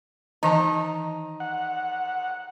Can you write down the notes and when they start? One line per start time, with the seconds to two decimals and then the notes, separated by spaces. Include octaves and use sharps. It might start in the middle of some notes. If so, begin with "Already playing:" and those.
0.43 D#3 E3 D#4 A5
1.40 F#5